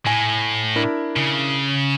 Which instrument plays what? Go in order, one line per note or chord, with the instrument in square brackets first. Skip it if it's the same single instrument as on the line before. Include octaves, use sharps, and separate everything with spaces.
[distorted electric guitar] A2 [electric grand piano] G#5
[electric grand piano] D4 E4 A#4
[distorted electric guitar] C#3